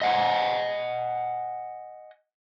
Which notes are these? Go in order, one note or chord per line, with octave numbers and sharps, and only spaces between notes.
D#5 F#5 G#5